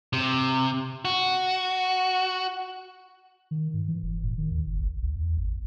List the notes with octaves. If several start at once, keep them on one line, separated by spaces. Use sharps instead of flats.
C3
F#4
D#3
G#2
E3
F1
A2
D#3
D#2
F#1
A1
D2
E2
G#1